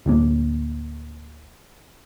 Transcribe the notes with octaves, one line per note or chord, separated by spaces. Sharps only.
D1 D2 A#3